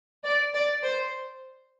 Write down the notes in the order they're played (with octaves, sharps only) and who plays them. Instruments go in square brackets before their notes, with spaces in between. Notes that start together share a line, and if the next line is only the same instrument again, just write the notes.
[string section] D5
D5
C5